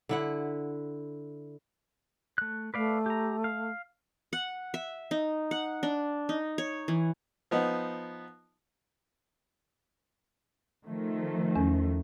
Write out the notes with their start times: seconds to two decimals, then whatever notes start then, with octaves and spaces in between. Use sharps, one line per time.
0.09 D3 E4 F#5
2.38 A3 F#6
2.74 A3 B4 D5 F5
3.06 G4 A#5
3.44 F5
4.33 F#5
4.74 E5
5.11 D#4
5.51 F#5
5.83 D4
6.29 D#4
6.58 C#5
6.88 E3
7.51 F3 B3 D#4
10.87 D#3 F3 A3
11.55 E2 C#4